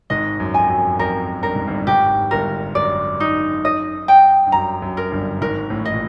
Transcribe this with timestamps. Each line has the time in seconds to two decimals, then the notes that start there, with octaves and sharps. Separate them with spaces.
0.10 G#1 G#2 D#5
0.40 F#2
0.54 F2 G#5
0.70 F#2
0.99 F2 A#4
1.43 G2 A#4
1.55 G#2
1.68 G1 G2
1.87 G#1 G#2 G4
2.31 G1 G2 A#4
2.75 F#2 D5
3.20 D#4
3.65 D#5
4.08 G5
4.46 G2
4.52 F#2 A#5
4.82 F#2
4.97 A#4
5.11 G1 G2
5.41 G#1 G#2 A#4
5.70 A1 A2
5.85 D#5
5.93 A#2